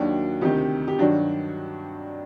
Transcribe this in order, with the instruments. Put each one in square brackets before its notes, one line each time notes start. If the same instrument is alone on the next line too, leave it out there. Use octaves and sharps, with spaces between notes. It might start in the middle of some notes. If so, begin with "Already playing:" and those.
Already playing: [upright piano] D#2 D#3 F#3 D4 F#4
D2 C3 D#3 D#4 G4
G4
G2 D#3 F#3 D4 F#4